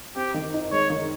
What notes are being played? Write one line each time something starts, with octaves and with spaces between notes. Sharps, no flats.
C4 G4
D#3
D#4
G#3 C#5
D#3